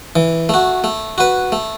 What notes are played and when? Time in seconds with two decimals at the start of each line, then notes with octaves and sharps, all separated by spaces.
0.16 E3
0.49 A3 F#4
0.84 A3
1.18 F#4 B4
1.52 A3